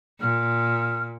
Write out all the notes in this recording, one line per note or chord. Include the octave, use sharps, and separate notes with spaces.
A#2 F6